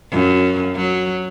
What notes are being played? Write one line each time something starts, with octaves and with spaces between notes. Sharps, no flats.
F#2
F#3